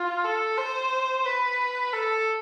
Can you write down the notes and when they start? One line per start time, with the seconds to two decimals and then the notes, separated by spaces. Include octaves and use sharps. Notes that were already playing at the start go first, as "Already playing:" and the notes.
Already playing: F4
0.24 A4
0.58 C5
1.26 B4
1.93 A4